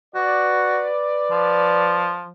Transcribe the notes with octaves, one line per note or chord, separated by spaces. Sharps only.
F#4 B4 D5
F3